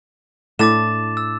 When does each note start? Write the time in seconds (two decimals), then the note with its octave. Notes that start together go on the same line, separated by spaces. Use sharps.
0.59 A2 D4 D6 A6 E7
1.17 E6